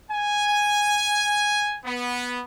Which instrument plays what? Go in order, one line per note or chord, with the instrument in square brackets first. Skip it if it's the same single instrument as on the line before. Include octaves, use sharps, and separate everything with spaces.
[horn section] G#5
B3